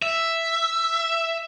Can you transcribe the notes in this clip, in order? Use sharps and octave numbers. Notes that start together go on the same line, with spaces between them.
E5